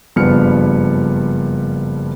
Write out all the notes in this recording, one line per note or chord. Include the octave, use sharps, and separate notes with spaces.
F#1 G2 F3 B3 F6 C#7